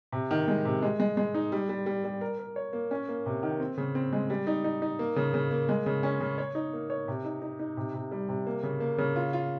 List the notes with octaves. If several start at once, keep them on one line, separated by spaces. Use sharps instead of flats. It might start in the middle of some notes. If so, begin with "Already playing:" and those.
C3
D#3
G#3
C3
G#3
G#3
G#3
D#4
G3
G3
G3
G3
A#4
A#4
C#5
A#3
C#4
A#3
C3
D#3
C4
C#3
C4
G#3
G3
D#4
D#4
D#4
A#3
C#3
C#3
A#3
G#3
C#3
C#4
C#3
C#5
D#4
A#3
C#5
C3
D#4
D#4
D#4
C3
C3
G3
C3
A#3
C#3
A#3
C#3
F4
F4